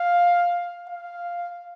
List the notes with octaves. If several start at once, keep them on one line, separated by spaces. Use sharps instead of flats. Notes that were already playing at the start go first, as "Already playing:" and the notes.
Already playing: F5
F5